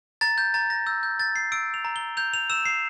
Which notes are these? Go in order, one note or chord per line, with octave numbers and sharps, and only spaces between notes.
A#5 A6
G6
A#5 A6
A#6
E6 G6
G6
G6 A6
C7
E6 D7
F7
A#5
G7
G6 F7
F7
E6 E7
C7